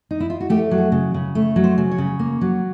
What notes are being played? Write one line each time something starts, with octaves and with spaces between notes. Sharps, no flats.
D#4
E4
F4
F#4
A3 G4
F#3
G#4
C#3
C#3
A3
F#3
C5
C#3
C#5
C#3
A#3
F#3